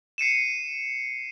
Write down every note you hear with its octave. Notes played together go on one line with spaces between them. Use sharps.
C7 C#7 D#7 E7